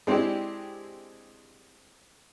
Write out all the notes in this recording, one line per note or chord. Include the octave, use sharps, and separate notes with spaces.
G#3 C4 D4 E4 G4